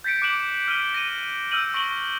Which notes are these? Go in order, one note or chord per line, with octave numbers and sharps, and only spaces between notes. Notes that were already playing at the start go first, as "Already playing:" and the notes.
G6 A6 B6 C#7 D7
D6 F#6 D7 E7 F#7
F6 B6 D#7 G7
A#6 D#7
E6 F6 G6 D#7 F#7 G7
C#6 A#6 D7 F#7 G7